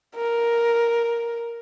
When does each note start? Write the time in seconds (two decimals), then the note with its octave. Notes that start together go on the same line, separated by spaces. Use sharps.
0.16 A#4